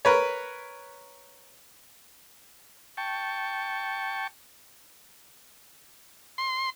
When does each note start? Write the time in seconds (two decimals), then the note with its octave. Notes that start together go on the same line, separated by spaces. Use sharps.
0.05 A#4 B4 C#5
2.97 G5 A5 C#6
6.38 C6